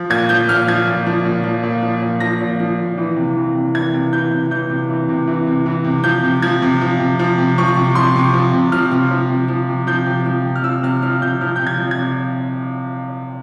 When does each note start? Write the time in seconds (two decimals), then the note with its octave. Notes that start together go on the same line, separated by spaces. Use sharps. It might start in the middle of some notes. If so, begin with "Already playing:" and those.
Already playing: F3
0.10 A#2 G#6
0.29 F3 G6
0.49 A#2 F6
0.68 F3 G#6
0.87 A#2
1.07 F3
1.26 A#2
1.44 F3
1.63 A#2
1.82 F3
2.02 A#2
2.20 F3 A#6
2.41 A#2
2.60 F3
2.78 A#2
2.98 E3
3.17 C3
3.36 E3
3.55 C3
3.74 E3 G#6
3.93 C3
4.12 E3 G6
4.31 C3
4.51 E3 G6
4.69 C3
4.90 E3
5.09 C3
5.28 E3
5.47 C3
5.66 E3
5.85 C3
6.04 F3 G6
6.23 C3
6.42 F3 G#6
6.62 C3
6.81 F3
7.00 C3
7.19 F3
7.38 C3
7.58 F3 C#6
7.77 C3
7.95 F3 C6
8.16 C3
8.34 F3
8.54 C3
8.72 F3 F6
8.91 C3
9.11 F3
9.30 C3
9.48 F3
9.69 C3
9.87 F3 G6
10.06 C3
10.26 F3
10.45 C3
10.55 F6
10.63 F3 E6
10.83 C3 F6
11.02 F3 F6
11.21 C3 G6
11.41 F3 F6
11.56 C3 G6
11.67 G#6
11.78 F3
11.91 G#6
11.98 C3